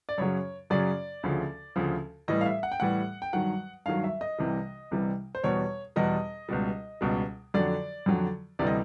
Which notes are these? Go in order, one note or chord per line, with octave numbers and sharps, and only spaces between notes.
D5
F#2 C#3 F#3 C#5
F#2 C#3 F#3 D5
D2 C#3 F3
D2 C#3 F3
A2 E3 G3 D#5
F5
E5
F#5
G5
A2 E3 G3 F#5
G5
G2 D#3 F#3 F#5
G2 D#3 F#3 F5
E5
D#5
C2 C3 E3 G3
C2 C3 E3 G3
C5
E2 B2 G3 C#5
E2 B2 G3 D#5
C#2 B2 G3
C#2 B2 G3
F2 D3 F#3 D5
F2 D3 F#3
D2 C3 E3 G3 D5
D#5